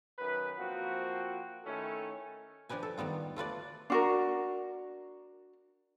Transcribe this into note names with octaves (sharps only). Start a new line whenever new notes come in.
F#2 D#3 B4
F3 A#3 C4 F#4
D#3 A3 C#4 E4 A4
F3 D4 G4 B4 G#5
A4
D#3 G3 B3 F4
A3 F4 B4 D5
D4 F#4 A#4